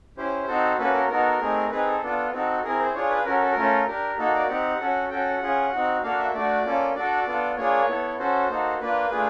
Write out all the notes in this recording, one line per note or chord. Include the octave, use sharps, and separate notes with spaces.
C#4 E4 G4 C5
C4 D#4 F#4 A4
A#3 C#4 F#4 A4 B4
A#4
B3 D#4 F#4 A4 A#4
A3 C4 D#4 G#4
C4 D#4 G#4 B4
A4
B3 D4 F4 A4
C4 D#4 F#4 A4
C4 E4 G#4 A#4
C5
D4 F4 G#4 C#5
B4
C#4 F#4 A4 A#4
A4
A#4
A3 C#4 F4 A4
D4 G4 A#4
A#3 D#4 F#4 A4
D5
C4 D#4 G4 F#5
C#4 F#4 A4
C#4 F#4 A4 G5
F#5
C#4 F4 G#4
C4 D#4 F#4
A#3 D4 F#4 A4 F5
E5
A3 D4 F#4 D5
A#3 C#4 F4 A4
D4 F#4 A4 D5
B3 D4 F4 A4
A#3 D4 F4 G#4 C#5
B3 E4 A4
C#4 F#4 A4 C5
A#3 D#4 F#4 A4
A#3 D4 F4 B4
A3 D4 F4 G#4